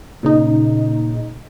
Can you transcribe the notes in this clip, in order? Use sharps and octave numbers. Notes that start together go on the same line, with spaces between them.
A#2 C#3 D#4